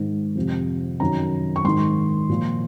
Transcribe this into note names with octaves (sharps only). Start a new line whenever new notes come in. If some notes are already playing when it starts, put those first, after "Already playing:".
Already playing: G#2 D#3
F2 C3 F3
F#2 D#3 A#5
C#6
G#2 D#3 C6
A#2 F3